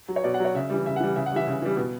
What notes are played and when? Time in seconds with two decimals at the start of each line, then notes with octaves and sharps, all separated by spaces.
0.08 F#3
0.16 C#5
0.24 B2 D5
0.34 F#5
0.40 F#3
0.45 C#5
0.55 C#3 E5
0.70 E3 G3
0.86 C#3 E5
0.96 F#5
1.00 E3 G3
1.16 C#3 E5
1.26 F#5
1.31 E3 G3 E5
1.47 C#3
1.62 E3 G3
1.77 B2